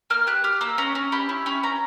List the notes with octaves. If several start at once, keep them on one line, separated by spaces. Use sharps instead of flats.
A#3 F6
G4 F#6
G4 F6
A#3 E6
C#4 A#5
C#4
G4 B5
E4
C#4 B5
C#4 A#5